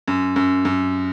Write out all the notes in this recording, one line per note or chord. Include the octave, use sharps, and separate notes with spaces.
F#2
F#2
F#2